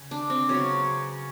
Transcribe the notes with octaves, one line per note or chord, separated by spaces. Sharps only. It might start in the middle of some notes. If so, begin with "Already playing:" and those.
Already playing: C#3
D4
C4
C#3 F#3 B3 C#4